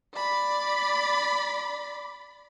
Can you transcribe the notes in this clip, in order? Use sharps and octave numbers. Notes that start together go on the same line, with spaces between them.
D5 B5